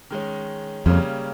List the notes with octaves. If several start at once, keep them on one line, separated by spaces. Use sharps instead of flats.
D#3 G#3 C#4
F2 C#3 G3 A#3 C#4